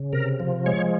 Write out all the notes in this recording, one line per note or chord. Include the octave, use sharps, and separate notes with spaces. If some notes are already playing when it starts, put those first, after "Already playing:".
Already playing: C#3
C3 A#4
F3
G#3 C#5